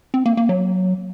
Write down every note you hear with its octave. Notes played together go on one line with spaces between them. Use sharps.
C4
A#3
A#3
F#3